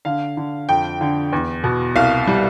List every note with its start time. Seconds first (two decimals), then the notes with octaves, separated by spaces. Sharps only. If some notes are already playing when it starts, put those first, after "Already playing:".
0.05 D3 F5
0.37 D3
0.69 F2 G5
1.01 D3
1.32 E2
1.64 B2
1.96 C2 F5
2.27 G3